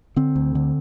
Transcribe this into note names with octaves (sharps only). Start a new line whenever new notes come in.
D3 C4
D2
D3